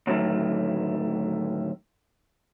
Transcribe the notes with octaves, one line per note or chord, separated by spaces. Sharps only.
A2 D3 D#3 F#3 A3